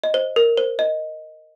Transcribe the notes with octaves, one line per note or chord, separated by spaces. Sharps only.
D#5
C5
A#4
C5
D#5